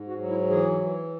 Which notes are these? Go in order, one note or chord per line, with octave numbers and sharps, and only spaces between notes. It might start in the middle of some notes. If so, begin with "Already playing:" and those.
Already playing: G#2
F#4
F#3
E4
E3 G#4
E3